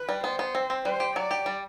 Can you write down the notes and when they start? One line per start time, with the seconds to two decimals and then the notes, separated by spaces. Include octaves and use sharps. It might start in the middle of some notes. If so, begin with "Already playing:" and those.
Already playing: B4
0.09 G3
0.23 B3 C5
0.39 B3
0.55 C4
0.70 C4
0.85 G3 C5
1.00 G4
1.16 F#3 D5
1.31 G4
1.46 G3